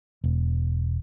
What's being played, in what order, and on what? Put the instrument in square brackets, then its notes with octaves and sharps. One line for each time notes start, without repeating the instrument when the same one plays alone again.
[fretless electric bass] E1